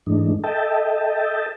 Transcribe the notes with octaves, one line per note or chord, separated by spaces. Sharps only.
G#2 E3 G#3 A3 D4 D#4
A4 D#5 E5 G5 A5